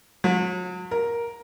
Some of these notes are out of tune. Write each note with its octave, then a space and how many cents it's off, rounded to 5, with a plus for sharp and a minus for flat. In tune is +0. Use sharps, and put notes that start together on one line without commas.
F#3 -35
A#4 +10